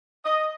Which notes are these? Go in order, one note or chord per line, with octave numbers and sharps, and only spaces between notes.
D#5